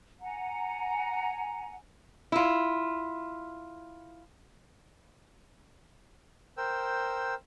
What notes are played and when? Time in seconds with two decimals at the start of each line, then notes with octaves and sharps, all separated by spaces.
0.22 F#5 G#5 A#5
2.32 E4 F4
6.57 A#4 C5 G5 E6